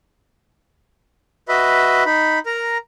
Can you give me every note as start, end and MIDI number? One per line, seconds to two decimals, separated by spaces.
1.48 2.04 66
1.48 2.04 71
1.48 2.04 75
1.48 2.04 76
1.48 2.04 83
2.06 2.39 63
2.06 2.39 83
2.46 2.77 70
2.46 2.77 82